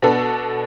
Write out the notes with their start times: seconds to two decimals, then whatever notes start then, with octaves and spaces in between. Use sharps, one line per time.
0.02 B2 B3 D4 A4